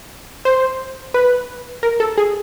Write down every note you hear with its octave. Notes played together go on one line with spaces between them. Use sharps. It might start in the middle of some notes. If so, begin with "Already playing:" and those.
C5
B4
A#4
A4
G#4